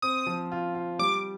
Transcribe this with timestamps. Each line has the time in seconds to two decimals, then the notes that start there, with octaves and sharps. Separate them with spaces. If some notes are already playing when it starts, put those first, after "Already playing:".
0.02 C4 D#6
0.27 F3
0.52 F4
0.75 F4
0.99 G3 D6